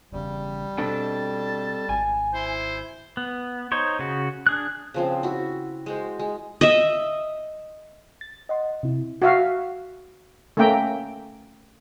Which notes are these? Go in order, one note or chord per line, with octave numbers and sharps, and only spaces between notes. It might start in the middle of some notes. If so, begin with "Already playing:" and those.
E1 E2 C#3 G3
B2 C4 D4 A4 G5 A5
G#1 G#5
E4 C5
B3
D#4 C5 C#5
C#3 F#4
D4 G#4 F#6
C#3 F3 C4
E4 F#4
G#3 F#4 C5
G#3
D#5 E5
A6
D#5 F#5 C6
C3 E4
F#4 E5 F5
A3 A#3 C#4 E5 G5 A#5